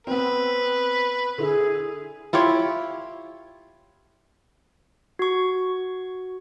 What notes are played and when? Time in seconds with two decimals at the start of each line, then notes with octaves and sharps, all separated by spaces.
0.07 B3 C4 B4
1.38 D3 E4 G#4
2.33 E4 F4 G4 C#5
5.19 F#4 C#6